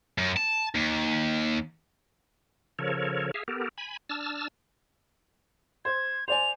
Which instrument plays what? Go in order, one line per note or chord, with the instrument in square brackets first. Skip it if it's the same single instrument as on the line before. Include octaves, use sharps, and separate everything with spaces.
[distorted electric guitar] F#2
A5
D#2
[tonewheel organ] C#3 F3 A4 A#4 C#5
G#4 E5 F5
B3 G4 A4 A#4
G#5 B5
D4 A5 E6 F6
[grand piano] C5 [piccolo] G#6
[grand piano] C5 D5 G#5 [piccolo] F7